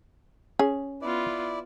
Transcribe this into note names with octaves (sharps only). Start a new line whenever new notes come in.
C#4 G#4
B3 E4 F4 D5